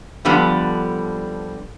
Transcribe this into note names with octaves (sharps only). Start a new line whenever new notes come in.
D3 F3 G3 B3